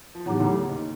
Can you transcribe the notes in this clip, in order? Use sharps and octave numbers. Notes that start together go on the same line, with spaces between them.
F3
E2 A2 E3 F#3 B3 D#4 G4
D2 D3
C#3
D#2 D#3